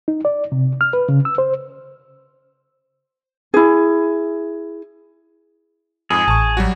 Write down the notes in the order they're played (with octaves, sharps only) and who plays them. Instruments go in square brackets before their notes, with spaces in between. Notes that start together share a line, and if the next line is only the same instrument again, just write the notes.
[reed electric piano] D#4
D5
C3
F6
B4
C#3
E6
C5
[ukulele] E4 G#4
[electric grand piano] F2 G#2 [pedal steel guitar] G#4
[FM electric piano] A1 [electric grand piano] A5 C#6
[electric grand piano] F#3 G3 F#4